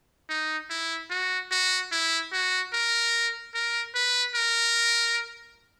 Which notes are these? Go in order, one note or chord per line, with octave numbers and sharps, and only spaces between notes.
D#4
E4
F#4
F#4
E4
F#4
A#4
A#4
B4
A#4